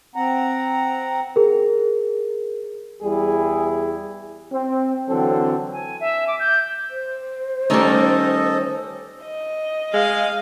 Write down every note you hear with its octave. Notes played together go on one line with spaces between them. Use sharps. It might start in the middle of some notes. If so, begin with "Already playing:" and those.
C4 F#5 A#5
G#4 A#4
E2 G3 E4 G#4
C4
D3 E3 F#3 C4 A4
G#5
E5
D6
G6
C5
D#3 G3 A3 C#4 A4 D#5
D#5
G#3 F5